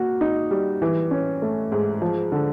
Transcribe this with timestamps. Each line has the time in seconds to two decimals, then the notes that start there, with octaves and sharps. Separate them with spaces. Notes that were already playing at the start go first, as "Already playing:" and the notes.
Already playing: A#3 F#4
0.21 D#4
0.51 G3
0.82 E3
1.11 C#4
1.42 A3
1.72 G#2
2.02 F3
2.32 D3